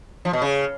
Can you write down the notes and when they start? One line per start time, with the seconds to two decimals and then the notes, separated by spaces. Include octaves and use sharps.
0.25 F3
0.33 B2
0.42 C#3